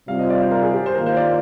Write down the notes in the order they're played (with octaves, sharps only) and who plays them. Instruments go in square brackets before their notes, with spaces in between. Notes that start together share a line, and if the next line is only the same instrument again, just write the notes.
[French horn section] C3 G3 C4 F4 [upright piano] F5
[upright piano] D#5
D5
C5
A#4
G#4
G4
C5
[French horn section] D#3 A#3 F4 [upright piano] A#4
[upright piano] C5
D5